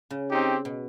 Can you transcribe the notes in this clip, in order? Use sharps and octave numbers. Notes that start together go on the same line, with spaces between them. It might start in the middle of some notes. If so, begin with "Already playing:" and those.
C#3
C4 D#4 G4
B2